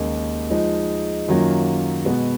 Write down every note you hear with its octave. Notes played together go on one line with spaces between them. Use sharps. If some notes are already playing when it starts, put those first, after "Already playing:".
Already playing: D#2 C#3 G#3 D#4 A#4
F3 G#3 D#4
F#2 D#3 F#3 A#3 F4
B2 G#3 B3